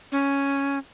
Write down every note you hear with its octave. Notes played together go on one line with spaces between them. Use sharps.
C#4